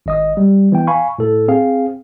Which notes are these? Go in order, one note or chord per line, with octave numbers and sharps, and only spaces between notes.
G#1 D#5 D#6
G3
E3 B3 G5
F5 G#5 B5 C#6
A2 A4
C4 G#4 F5